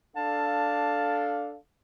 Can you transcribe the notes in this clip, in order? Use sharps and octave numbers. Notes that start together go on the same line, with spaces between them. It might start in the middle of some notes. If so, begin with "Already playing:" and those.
D4 A4 F5 A5